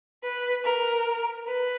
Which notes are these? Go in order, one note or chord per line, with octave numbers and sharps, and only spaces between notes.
B4
A#4
B4